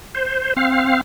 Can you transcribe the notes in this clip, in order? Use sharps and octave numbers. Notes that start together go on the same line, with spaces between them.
C5
C4 F5